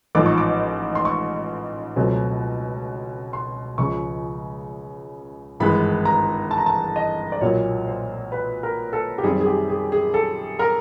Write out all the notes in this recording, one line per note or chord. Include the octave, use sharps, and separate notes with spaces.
A1 G#2 F3 D6
C#6
D6
C6
C#6
C#2 B2 F#3 A3 C4
C6
C#2 C#3 F3 C#6
G#1 G2 E3 G#3 B5
A#5
A5
A#5
A5
D#5
D5
B1 A#2 F#3 A#3 C#5
C5
B4
A#4
A4
G4
F#2 D#3 G3 C4 G#4
G#4
G4
G#4
G#4
A4
A#4